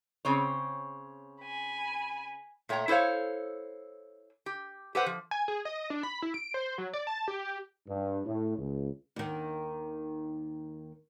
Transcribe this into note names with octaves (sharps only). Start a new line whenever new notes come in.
C#3 C4 C#5
G#5 B5
A#2 A3 C#5 G5 A#5
E4 A4 C5 C#5 F5
G4
G4 A4 B4 C5 F#5
F3
G#5
G#4
D#5
D4
B5
E4
D7
C5
F#3
D5
A5
G4
G2
A2
C#2
D#2 D#3